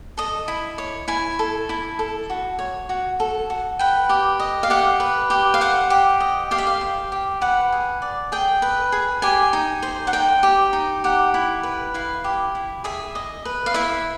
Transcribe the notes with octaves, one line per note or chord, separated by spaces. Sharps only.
A4 D#5
E4
C#5
E4 G#5
A4
E4
A4
F#4
C#5
F#4
A4
F#4
B4 G5
G4
D#5
F5
G4 F#5
B4
G4
F5
C5 F#5
G4
D#5
G4 F5
E5
F5
C5
G4
B4 F#5
G#4
D5
G#4 G5
B4
G#4
G4 G#5
D#4
C5
F#5
D#4 G5
G4
D#4
G4 F#5
E4
B4
E4 F5
G4
E4
G#4 E5
D#5
B4
F5
E4 E5